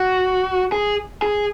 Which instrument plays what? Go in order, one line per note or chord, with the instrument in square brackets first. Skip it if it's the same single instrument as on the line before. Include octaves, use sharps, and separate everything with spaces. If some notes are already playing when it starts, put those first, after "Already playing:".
Already playing: [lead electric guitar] F#4
G#4
G#4